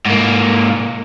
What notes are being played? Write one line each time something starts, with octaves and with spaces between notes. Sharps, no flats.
G#2 A#3